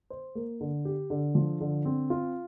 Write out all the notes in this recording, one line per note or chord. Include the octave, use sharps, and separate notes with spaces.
C5
A#3
D3
G4
D3
F3
D3
C4
F4